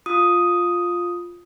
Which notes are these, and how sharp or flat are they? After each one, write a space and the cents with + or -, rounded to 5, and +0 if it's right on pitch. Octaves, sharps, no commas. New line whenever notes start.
F4 +5 D#6 +0